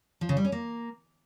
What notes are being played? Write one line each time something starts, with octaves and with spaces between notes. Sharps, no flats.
F3
C#3
G3
C#4
A#3